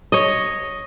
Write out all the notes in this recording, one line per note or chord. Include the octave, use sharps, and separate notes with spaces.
C#5 D#5